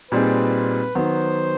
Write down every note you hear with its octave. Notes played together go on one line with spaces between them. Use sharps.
A#2 G3 C4 D#4 G#4 B4
D#3 F#3 B3 C5